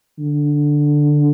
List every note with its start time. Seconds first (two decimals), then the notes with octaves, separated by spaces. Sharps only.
0.19 D3